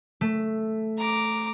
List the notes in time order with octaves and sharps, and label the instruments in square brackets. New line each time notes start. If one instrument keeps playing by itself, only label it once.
[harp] A3
[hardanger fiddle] A#5 D6